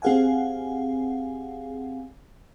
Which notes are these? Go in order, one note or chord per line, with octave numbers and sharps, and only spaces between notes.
C4 G4 G#4 F5 F#5 G#5